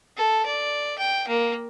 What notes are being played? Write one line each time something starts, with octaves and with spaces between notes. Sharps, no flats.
A4
D5
G5
A#3